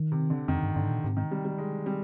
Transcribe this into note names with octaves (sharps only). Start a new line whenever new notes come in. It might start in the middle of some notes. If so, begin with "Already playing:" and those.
Already playing: D#3
C3
D3
F2 D#3
G2
G2 D3
G#2
A#2
G#2 C3
D#3
G3
G3
G#3
G3